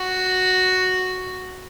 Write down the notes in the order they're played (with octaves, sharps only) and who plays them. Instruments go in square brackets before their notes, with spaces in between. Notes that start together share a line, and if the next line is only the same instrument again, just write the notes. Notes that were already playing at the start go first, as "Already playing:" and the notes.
Already playing: [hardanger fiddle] F#4